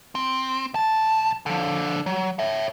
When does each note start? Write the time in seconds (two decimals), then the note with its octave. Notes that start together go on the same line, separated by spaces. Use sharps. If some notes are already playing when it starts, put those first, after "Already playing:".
0.15 C4
0.74 B1 A5
1.46 D3 F3
2.06 F#3
2.39 C#5 E5